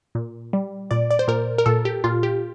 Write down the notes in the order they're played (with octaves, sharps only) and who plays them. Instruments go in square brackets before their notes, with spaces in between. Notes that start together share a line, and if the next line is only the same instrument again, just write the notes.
[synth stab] A#2
G3
A#2 D5
D5
C5
A#2 A#4
A#4
A#2 A4
G4
A#2 F4
G4